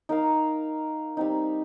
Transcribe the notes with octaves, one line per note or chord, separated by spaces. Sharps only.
D#4 A#4 F5
G3 C4 D#4